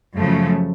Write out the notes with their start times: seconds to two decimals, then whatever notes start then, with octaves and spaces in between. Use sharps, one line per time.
0.17 F#2 C#3 F3 A3